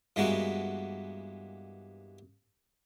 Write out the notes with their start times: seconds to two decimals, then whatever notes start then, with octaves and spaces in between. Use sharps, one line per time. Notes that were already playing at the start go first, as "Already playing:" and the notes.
0.16 G2 E3 G#3 A#3 B3 F#4